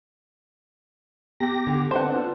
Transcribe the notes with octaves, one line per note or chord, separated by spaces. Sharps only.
B3 G4 G5 A#6
D3 A4
B3 C4 D4 C5 F#5 A5
F4